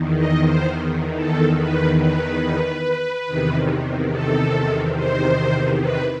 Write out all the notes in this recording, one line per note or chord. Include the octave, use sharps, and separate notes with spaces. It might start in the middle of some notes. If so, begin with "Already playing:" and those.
Already playing: E2 D#3
D#5
C5
A4
B4
B4
E2 C3 D#3
A4
C5
B4